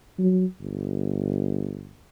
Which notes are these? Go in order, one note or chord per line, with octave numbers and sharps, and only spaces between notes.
F#3
G1